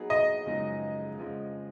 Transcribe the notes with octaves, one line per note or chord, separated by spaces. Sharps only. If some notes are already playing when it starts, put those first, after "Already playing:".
Already playing: F#3 B3 D#4 G#4
D#5
F#2 C#3 F3 G#3 D#4
F2 C#3 F3 G#3